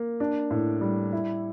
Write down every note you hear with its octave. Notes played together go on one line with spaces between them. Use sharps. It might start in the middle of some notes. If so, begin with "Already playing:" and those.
Already playing: A#3
D4
A2
G3
E4